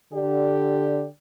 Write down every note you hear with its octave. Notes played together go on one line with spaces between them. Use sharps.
D3 G4 D5